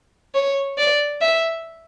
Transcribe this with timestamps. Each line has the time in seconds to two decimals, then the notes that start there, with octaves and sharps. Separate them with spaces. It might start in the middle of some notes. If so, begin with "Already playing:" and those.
0.35 C#5
0.78 D5
1.21 E5